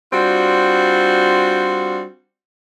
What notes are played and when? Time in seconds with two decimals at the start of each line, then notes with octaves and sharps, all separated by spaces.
0.12 G3 C4 D4 F4 F#4